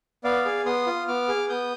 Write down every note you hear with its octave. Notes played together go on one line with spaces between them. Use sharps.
B3 D5 F5
G#4
B3 C6 D#6
F4
B3 D6 F6
G#4
B3 D#6 G6